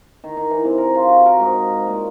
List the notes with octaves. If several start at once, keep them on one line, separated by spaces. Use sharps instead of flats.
D#3
D#3
E3
C3
A#4
F4
F#4
A#4
G#2
D#5
A#2